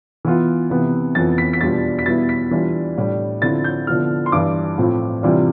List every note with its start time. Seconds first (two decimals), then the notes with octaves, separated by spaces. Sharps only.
0.25 E3 B3 F4
0.70 C3 E3 B3
1.15 F2 E3 B3 A6
1.38 B6
1.53 B6
1.61 E2 B2 G3 D4 F4 A6
1.99 B6
2.06 E2 B2 G3 B3 E4 A6
2.29 B6
2.51 E3 G3 D4 F4
2.97 A2 G3 D4
3.42 D3 F3 C4 E4 A6
3.64 G6
3.87 D3 F3 B3 E4 F6
4.26 C6
4.32 G2 E3 G3 D6
4.78 A2 F3 C4 F4
5.23 C3 E3 G3 D4 F4